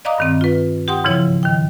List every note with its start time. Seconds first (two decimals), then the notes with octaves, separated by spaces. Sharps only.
0.05 D5 D#5 F5 A#5 D6 D#6
0.18 G2 D#3 C4
0.41 F4 B4
0.88 G4 F#5 G5 C6 D#6
1.04 G#2 C#3 E3 F3 E4 C#5
1.43 D#3 G5